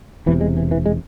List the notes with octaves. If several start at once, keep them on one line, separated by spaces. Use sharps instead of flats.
E1 E2 C3 E3
G#3
E3
E3
G#3